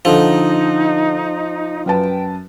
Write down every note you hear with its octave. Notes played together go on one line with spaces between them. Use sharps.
D3 F3 D#4 A4
F#2 B4 G5 A5